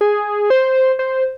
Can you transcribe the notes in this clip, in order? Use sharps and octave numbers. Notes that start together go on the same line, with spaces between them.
G#4
C5
C5